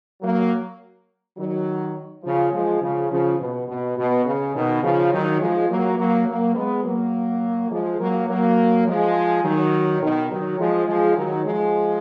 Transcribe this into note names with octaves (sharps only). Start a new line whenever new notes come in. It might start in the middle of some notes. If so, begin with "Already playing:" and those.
F#3 A#3
D#3 F#3
C#3 F3
F3 G#3
C#3 F3
C#3 F3
B2
B2
B2
C#3
B2 D#3
C#3 F3
D#3 F#3
F3 G#3
F#3 A#3
F#3 A#3
F#3 A#3
G#3 B3
F#3 A#3
F3 G#3
F#3 A#3
F#3 A#3
F3 G#3
D#3 F#3
B2 D#3
D#3 F#3
F3 G#3
F3 G#3
D#3 F#3
F3 G#3